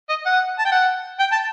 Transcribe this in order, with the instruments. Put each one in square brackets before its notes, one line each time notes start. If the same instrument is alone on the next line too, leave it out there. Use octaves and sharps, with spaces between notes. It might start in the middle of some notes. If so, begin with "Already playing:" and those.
[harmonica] D#5
F#5
A5
G5
F#5
G5
A5